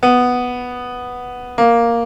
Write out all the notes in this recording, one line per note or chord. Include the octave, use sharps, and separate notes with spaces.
B3
A#3